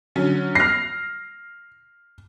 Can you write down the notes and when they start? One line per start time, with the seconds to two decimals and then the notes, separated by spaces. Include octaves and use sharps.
0.16 D3 F#3 C#4
0.55 F6 A#6 C7